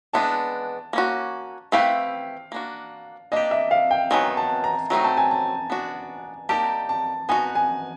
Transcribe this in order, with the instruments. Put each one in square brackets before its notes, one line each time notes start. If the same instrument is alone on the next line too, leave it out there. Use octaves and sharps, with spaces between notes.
[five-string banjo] E3 G#3 B3 D4 [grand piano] A5
[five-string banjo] A#3 C#4 F#4
[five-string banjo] A3 C4 E4 G4 B4 [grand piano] F5
[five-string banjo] A#3 D4 F#4
[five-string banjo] A#3 D4 G4 [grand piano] D#5
[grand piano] E5
F5
G5
[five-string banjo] D#3 F#3 B3 [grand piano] G#5
[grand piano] A5
A#5
[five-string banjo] F#3 A3 C4 D#4 [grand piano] A#5
[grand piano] A5
G#5
A5
[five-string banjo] B3 D4 F#4
[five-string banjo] G3 A#3 D#4 G4 A#4 [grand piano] A5
[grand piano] A5
[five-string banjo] B3 D#4 F#4 [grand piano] G#5
[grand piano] G#5